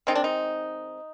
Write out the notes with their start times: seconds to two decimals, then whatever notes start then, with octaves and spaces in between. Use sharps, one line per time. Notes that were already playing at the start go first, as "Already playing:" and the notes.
0.07 D#3 G#3 C4 D#4
0.15 D4
0.24 D#4